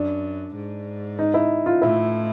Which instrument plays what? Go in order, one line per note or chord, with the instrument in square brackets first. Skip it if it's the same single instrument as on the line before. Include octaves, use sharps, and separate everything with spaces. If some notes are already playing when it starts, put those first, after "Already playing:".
Already playing: [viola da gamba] F#2 [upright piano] D4
[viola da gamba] G#2
[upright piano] D#4
E4
F4
[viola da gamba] A2 [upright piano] E4